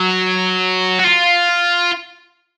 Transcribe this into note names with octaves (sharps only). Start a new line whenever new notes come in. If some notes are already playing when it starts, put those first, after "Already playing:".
Already playing: F#3
F#4
F4